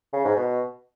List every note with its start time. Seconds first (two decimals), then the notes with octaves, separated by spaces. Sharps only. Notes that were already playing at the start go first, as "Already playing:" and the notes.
0.13 C#3
0.24 G#2
0.36 B2